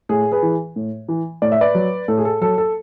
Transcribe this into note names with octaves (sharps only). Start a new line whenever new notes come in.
A2 G#4
G#4 B4
E3
A2
E3
A2 D5
E5
B4 D5
F#3
A2 A4
G#4
A4
F#3 A4
A4